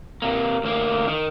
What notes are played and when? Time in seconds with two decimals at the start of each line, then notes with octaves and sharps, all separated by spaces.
0.22 C3 A#3
0.64 D2 A#3
1.08 D#3